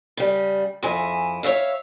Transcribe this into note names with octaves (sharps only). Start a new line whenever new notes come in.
C#3 G3
F2 E4 G#4 G#5
C#5 D5 E5 F5